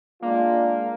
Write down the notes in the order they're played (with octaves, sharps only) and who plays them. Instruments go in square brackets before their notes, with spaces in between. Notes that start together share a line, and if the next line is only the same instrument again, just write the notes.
[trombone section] G#3 D4 F4 [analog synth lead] A#3